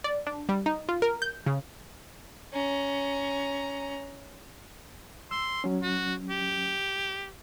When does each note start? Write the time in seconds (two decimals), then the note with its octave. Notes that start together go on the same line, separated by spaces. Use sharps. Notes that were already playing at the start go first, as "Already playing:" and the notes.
0.04 D5
0.27 D4
0.49 G3
0.66 D#4
0.89 F4
1.02 A#4
1.22 G6
1.46 C#3
2.53 C#4 A#5
5.31 C6 E6
5.64 F#3 C#4
5.82 F#4
6.30 G4